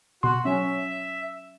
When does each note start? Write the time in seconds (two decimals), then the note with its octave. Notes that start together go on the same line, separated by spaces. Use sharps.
0.23 B2 F#4 C6
0.45 F#3 C#4 E5